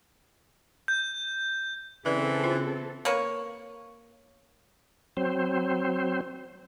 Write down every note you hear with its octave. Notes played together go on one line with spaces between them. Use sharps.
G6
C#3 E3 C4 A4 B4 D5
F4 C5
A#3 B4 C#5
F#3 C4 C5